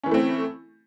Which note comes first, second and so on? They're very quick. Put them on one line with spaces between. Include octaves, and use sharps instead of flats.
C#4 E3 E4 A3 C4